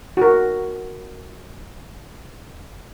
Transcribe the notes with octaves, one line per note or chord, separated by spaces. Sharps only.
F#4 A#4